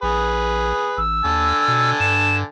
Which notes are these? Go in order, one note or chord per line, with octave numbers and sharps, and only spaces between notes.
A#1 G#4 B4
A1 E6
D#2 D3 G#5 A5
B2
G2 E7